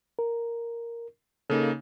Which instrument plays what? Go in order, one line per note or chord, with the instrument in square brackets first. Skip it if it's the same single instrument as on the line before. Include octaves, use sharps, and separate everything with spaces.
[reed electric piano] A#4
[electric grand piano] C#3 A#3 D#4 [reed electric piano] A4